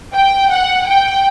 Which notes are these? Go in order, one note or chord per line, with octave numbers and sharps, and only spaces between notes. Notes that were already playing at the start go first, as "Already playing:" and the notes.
G5
F#5
G5